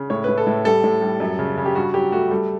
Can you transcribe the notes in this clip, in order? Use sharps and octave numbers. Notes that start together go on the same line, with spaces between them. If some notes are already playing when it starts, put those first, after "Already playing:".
Already playing: C#3
A2 C#5
A2 B4
A4
A2
G3 A4
A2
G3
F#2
C#3
C#3
G4
G2 F#4
F#3 G4
A3 F#4
G3 A4